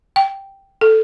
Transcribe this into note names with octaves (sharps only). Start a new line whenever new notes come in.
G5
A4